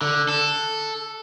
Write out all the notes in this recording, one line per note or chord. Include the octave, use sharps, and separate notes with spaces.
D3
A4